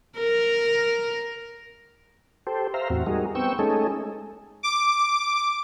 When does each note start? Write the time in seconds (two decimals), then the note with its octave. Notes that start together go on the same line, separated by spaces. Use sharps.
0.18 A#4
2.47 G4 A4 C5
2.74 C5 E5 F5 A#5
2.90 E2 A2 C4 F#4
3.06 G3 G#3 D#4 F#4 G#4 A#4
3.35 B3 C4 G5 C#6 E6
3.59 G#3 A3 C#4 D#4 G#4 A4
4.63 D6